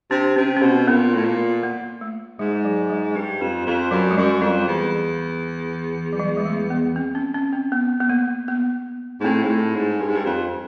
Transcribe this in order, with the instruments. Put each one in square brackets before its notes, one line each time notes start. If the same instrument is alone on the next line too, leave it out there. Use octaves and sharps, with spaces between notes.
[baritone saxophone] C3 [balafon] D4
[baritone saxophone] C3 [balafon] C#4
[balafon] C#4
[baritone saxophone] B2 [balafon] C4
[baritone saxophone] A#2 [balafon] B3
[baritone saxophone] A2
A#2
[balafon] A#3
A3
[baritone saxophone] G#2 [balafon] G#3
[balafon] F#3
G#3
[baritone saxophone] G2
F2
F2
[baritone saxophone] F#2 [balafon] F#3
[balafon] G#3
[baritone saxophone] F#2 [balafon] G3
[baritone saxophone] F2 [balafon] G3
[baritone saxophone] E2
[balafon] F#3
G3
G#3
A3
B3
C4
C#4
C#4
C4
B3
B3
A#3
B3
[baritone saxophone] G#2
[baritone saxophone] A2 [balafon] C4
[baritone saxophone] G#2
A2
G#2
G2
G#2
G2
F2